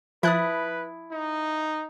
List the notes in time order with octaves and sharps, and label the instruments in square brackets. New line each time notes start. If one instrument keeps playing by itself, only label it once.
[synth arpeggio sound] F3 F#6 [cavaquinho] E4 A5 D#6 [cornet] B4
[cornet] D#4